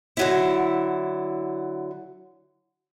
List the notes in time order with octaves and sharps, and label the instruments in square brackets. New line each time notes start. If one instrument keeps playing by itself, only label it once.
[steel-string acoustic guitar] D3 F#3 E4